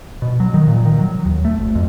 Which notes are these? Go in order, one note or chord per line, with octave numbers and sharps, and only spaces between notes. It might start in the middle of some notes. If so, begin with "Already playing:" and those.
B2
F#3
D#3
A#2
D#3
F#3
D#2
A3
G#1
F2